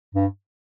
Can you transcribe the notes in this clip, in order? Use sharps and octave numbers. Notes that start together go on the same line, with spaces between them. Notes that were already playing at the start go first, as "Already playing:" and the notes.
G2